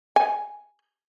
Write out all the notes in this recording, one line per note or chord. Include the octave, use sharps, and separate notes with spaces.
G#5